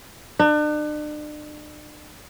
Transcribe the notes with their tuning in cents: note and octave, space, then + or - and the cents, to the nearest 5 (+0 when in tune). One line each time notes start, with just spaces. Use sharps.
D4 +40